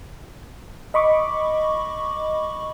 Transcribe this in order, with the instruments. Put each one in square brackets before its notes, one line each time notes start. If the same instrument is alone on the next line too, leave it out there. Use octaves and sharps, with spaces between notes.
[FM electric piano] D#5 B5 C#6 D6